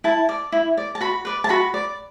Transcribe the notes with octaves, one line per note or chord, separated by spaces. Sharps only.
E4 A5
D5
E4
D5
A5
F#4 B5
B4 D5
A5
F#4 B5
D5